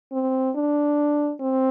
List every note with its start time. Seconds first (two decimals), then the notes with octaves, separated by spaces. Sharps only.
0.12 C4
0.56 D4
1.41 C4